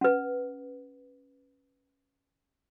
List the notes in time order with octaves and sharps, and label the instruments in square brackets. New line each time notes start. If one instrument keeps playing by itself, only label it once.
[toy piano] C#4 B4